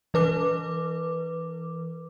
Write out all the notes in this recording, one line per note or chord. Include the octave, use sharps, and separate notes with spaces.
E3 B4 D6